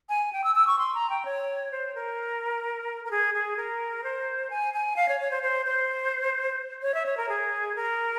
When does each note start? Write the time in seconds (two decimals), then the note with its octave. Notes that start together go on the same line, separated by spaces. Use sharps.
0.09 G#5
0.33 G5
0.44 E6
0.55 E6
0.67 C#6
0.79 C6
0.94 A#5
1.10 G5
1.25 C#5
1.72 C5
1.95 A#4
3.05 A#4
3.11 G#4
3.34 G#4
3.57 A#4
4.04 C5
4.50 G#5
4.74 G#5
4.96 F5
5.09 C#5
5.20 C#5
5.31 C5
5.43 C5
5.66 C5
6.82 C#5
6.94 E5
7.06 C#5
7.17 A#4
7.29 G#4
7.76 A#4